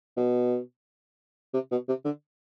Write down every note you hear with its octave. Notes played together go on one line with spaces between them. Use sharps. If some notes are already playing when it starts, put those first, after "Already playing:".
B2
C3
B2
C3
D3